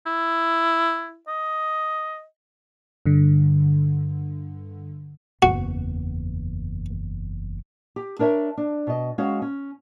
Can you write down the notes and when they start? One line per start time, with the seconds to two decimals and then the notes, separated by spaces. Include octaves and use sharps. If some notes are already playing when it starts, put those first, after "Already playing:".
0.07 E4
1.28 D#5
3.06 G2 D3
5.42 F#1 E2 F#4
7.96 G4
8.19 D4 A#4 C#5 E5
8.58 D4
8.87 B2 D#5
9.18 G#3 C#4 F#4 C#5 F5
9.42 C#4